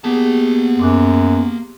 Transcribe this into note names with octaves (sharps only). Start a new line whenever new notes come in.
A#3 B3 G4 G#4 A5
F#2 C6 D6 F#6